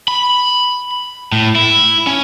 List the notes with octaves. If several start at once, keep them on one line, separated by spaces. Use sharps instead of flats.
B5
A2
E4
C#4